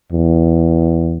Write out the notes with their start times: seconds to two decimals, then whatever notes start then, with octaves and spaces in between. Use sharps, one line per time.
0.13 E2